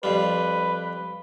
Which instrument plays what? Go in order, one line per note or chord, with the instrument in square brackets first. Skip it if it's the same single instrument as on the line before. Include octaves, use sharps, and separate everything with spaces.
[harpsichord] F2 G3 [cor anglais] B4